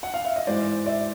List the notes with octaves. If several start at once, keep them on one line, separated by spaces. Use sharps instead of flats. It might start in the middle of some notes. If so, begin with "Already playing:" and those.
F#5
F5
E5
D#5
G#2 E3 G#3 C5 D5
D5 E5